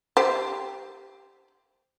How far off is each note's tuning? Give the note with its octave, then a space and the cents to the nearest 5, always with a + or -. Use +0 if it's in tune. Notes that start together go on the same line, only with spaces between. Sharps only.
G4 +0 C5 +0